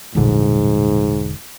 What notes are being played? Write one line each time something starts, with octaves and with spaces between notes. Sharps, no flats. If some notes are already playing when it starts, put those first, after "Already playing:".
E1 A#1 G#2 D3 G3